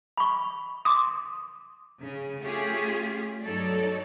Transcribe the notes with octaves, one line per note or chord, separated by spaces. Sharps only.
B5 C#6
C6 D6 D#6
C#3
A3 C#4 F4 G4 G#4
G2 F#3 D#4 A4 C#5 D5